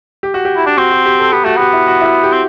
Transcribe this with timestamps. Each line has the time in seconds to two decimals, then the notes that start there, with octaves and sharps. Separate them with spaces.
0.23 G4
0.34 F#4
0.45 G4
0.57 E4
0.67 D4
0.78 C4 F#4
0.92 F#4
1.06 G4
1.19 A4
1.33 B3 G4
1.45 A3 F#4
1.57 B3 G4
1.73 E4
1.87 F#4
2.01 E4
2.05 F#4
2.23 G4
2.32 C4